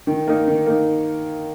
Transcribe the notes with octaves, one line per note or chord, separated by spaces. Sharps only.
D#3
A#3 D#4
D#3
A#3 D#4